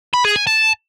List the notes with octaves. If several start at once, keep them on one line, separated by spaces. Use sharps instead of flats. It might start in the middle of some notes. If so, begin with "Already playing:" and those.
B5
G#4
G#5
A5